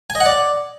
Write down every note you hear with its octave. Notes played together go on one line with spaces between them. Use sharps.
G#5
D#5
F#5
D5